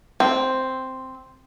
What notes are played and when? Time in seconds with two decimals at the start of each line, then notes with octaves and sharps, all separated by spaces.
0.20 C4